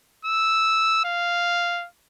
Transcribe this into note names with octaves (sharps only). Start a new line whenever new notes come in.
E6
F5